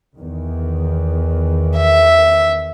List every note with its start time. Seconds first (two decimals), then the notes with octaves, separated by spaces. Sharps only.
0.18 E2 D#3
1.76 E5